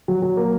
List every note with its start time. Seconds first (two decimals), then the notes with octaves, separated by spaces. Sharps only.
0.08 F#3
0.22 F#3
0.37 A#3